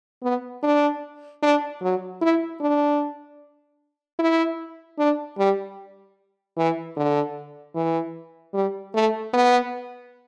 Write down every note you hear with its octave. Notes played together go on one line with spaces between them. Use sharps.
B3
D4
D4
F#3
E4
D4
E4
D4
G3
E3
D3
E3
G3
A3
B3